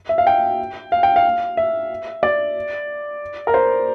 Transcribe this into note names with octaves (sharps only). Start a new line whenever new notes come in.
E5
F5
G5
F5
G5
F5
E5
D5
A#4
C5